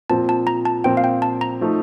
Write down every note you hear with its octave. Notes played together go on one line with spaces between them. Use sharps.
A#2 F3 C4 A5
A5
A#5
A5
A#2 F3 C4 G5
F5
G5
A5
A#5
F3 A3 D#4